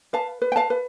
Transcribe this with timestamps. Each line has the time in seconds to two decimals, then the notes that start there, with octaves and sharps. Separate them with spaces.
0.13 B4 F5 A5
0.42 B4
0.52 G5
0.56 F5 A5
0.70 B4